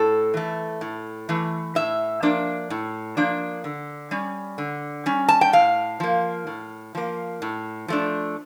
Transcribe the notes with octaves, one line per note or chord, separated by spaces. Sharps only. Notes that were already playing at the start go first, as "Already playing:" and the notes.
Already playing: A2 A4
E3 A3
A2
E3 A3
A2 E5
F3 A#3 D4
A2
F3 A#3 D4
D3
G3 C#4
D3
G3 C#4
A5
G5
A2 F5
F3 A#3
A2
F3 A#3
A2
F3 A3 D4